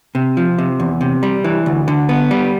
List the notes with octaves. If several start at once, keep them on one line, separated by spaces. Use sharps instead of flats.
C3
F3
C3
E2
C3
G3
E3
D2
D3
B3
G3